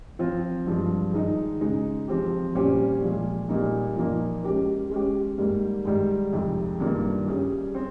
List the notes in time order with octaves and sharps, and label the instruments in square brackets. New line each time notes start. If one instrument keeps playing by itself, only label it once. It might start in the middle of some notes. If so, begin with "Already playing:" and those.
[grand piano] F3 C4 F4
G2 F3 G#3
G#2 D#3 G#3 D#4
C#3 G#3 D#4
F3 C4 G4
A#2 G3 C#4 G4 C5
A#2 F3 G#3
A#2 G3 A#3 D#4
A#2 F3 A#3 D#4
G#3 C#4 G4 A#4
G#3 C#4 G4
G#2 G3 A#3
G#2 D#3 G3
F2 C3 D#3 G#3
G2 D#3 A#3 F4 A#4
G3 C#4 G#4
C4